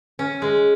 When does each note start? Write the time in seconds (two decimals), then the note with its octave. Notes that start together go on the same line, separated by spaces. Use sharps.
0.19 C#4
0.42 G#3